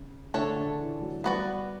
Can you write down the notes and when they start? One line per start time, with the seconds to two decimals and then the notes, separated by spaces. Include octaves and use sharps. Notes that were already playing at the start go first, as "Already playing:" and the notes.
Already playing: C#3
0.34 D3 A3 D4 A4 C#5
0.56 D3
0.79 E3
1.02 F#3
1.24 G3 B3 F#4 B4 D5